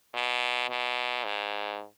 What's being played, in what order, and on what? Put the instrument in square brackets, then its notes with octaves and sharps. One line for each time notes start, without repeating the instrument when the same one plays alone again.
[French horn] B2
B2
G#2